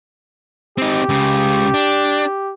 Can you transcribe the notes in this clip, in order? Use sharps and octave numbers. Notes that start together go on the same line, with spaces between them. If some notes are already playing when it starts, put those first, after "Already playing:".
C4 D#4 G4
C#2 C#3
D4